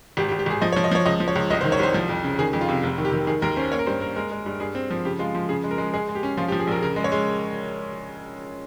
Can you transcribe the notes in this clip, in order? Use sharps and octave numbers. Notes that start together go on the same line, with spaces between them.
G#1 G4
G4
G#1
G4
G#1 G#4
F3 D#5
C#5
F3
D#5
F3 C#5
C#2 D#5
F3
C#5
C#2
C2 D#5
C5
D#3
C#5
C2 C5
F3
F2
C#3
D#3 G#4
F2
F4
C3
F1
D#3
G4
D#3
D#3 G#4
D#2 A#4
C#4 C5
A#3 C#5
A#4
G2 C5
A#3 A#4
G#3 A#4
G#3
G2
G2 G#4
C4
F3
C#3 G4
G#3 F4
F3
C#3 G#4
G#3
A#4
G#3
G#3 G#4
G#3
G4
C#4
F3 F4
G4
F3
G#4
A#1 A#4
C#3 A#4
G#3
C#5
G#3